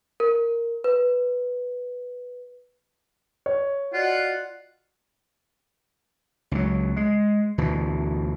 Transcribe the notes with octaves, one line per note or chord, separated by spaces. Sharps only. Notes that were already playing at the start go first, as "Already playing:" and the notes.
A#4
B4
C#5
F4 F#4 D5 D#5 F#5
C#2 F#3
G#3
D2 B2 E3